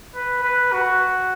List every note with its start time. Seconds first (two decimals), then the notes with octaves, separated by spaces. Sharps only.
0.15 B4
0.43 B4
0.72 F#4